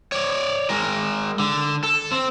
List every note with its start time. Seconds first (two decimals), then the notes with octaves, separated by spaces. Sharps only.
0.12 C#5 D5
0.69 G#3 A#4
1.39 D3
1.83 A4
2.12 C4